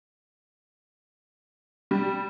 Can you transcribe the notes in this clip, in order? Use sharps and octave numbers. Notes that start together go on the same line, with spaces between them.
G3